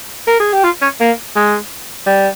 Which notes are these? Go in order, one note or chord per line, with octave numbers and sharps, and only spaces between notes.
A#4
G#4
G4
F4
C#4
A#3
G#3
G3